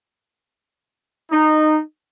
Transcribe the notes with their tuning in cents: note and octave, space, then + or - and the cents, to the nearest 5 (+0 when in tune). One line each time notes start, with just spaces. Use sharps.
D#4 -15